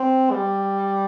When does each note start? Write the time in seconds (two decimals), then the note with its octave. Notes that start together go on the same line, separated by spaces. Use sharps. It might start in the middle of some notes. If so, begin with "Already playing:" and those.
Already playing: C4
0.32 G3